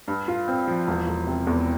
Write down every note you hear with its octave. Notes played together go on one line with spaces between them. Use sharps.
G2
F4
C4
F3
E1
E1
C3
E2